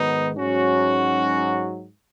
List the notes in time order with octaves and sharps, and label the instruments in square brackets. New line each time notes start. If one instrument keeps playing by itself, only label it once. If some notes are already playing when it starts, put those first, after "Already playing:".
Already playing: [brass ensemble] G#2 D#3 F#3 B3 D#4
G#2 F#3 C#4 F#4